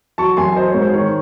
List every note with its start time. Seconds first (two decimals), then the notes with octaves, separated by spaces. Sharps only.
0.18 F#3 A5 C#6
0.37 F#2 G#5 C6
0.56 F#3 C5 D#5
0.68 C#5
0.74 G#2
0.82 C5
0.94 D#3 C#5